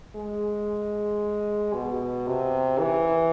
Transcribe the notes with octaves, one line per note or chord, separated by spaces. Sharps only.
G#3
B2
C3
E3